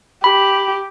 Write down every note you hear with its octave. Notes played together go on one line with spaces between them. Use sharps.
G4 B5